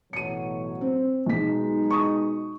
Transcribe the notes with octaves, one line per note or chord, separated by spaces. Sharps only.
A1 B2 F#3 C#7 D#7
C4
B1 B2 G#3 D#4 B6
C#6 D#6